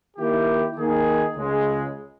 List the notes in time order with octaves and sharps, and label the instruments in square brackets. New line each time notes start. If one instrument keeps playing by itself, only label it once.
[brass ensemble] D#3 A#3 E4 G4
D#3 A#3 D#4 G#4
C#2 C#3 G#3